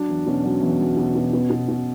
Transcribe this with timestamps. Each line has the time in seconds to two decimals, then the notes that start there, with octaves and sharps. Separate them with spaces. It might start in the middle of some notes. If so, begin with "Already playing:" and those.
Already playing: F#3 D4
0.08 E2
0.26 B2 C#4
0.44 F#3 C#4
0.61 E2
0.80 F#3
0.97 B2
1.15 B2
1.33 B2
1.50 B2
1.68 B2